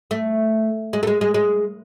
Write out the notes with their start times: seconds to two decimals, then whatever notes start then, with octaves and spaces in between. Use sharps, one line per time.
0.11 A3
0.93 G#3
1.03 A3
1.07 G#3
1.21 G#3
1.34 G#3